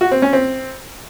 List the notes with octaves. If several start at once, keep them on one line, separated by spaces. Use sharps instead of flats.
F#4
C4
C#4
C4